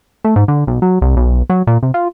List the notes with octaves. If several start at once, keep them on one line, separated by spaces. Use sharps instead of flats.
A3
G#2
D3
B1
F#3
C2
B1
F#3
A#2
C3
F4